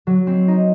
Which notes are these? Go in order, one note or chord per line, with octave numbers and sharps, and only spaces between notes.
F#3
C4
D#4